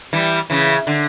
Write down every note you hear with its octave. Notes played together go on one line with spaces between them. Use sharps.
E3 G3
C#3 E3
D3